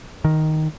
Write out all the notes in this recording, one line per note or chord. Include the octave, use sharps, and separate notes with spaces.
D#3